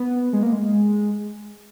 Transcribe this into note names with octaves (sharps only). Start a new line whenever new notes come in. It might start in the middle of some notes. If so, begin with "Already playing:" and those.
Already playing: B3
G#3
A#3
G#3